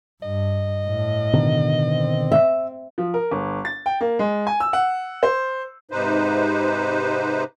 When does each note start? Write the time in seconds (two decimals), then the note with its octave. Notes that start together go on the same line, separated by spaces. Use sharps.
0.23 G2 D#5
0.85 A2
1.33 B2 D3 D#3
1.86 C4
2.32 E5
2.98 F3
3.14 A#4
3.31 G1
3.65 A6
3.86 G5
4.01 A#3
4.19 G#3
4.47 G#5
4.60 E6
4.73 F#5
5.23 C5
5.91 G#2 C3 D#4 B4 C5